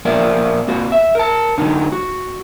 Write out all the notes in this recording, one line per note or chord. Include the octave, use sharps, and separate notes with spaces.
F3 A#3 A#4 D5 E5
A#3 C4 F#4 D5
E5
A#4 A5
D3 F#3 D#4
F#4